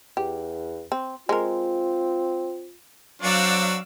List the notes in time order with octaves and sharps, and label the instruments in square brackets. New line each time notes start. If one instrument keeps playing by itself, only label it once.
[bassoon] E2 [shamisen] G4
[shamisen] C4
[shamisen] G#3 A#4 [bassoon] C4 [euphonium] F4
[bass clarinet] F#3 [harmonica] C4 D4 F#4 [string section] D5 F5 E6